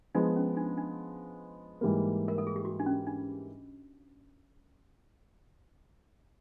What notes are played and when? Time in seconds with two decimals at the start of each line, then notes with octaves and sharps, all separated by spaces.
0.15 F3 G#3 B3 D4
0.36 C#4
0.57 D4
0.77 D4
1.81 G#2 E3 G3 A#3
2.28 A#4
2.38 A4
2.47 G#4
2.56 G4
2.65 F#4
2.80 D4
2.86 C#4
3.07 D4